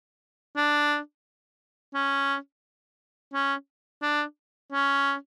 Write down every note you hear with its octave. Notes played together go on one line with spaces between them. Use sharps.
D4
C#4
C#4
D4
C#4